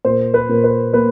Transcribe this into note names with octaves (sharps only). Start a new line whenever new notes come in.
A#2 C5
B4
A#2
B4
A#3 B4